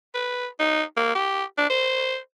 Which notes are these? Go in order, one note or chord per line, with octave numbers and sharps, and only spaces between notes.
B4
D#4
A#3
G4
D4
C5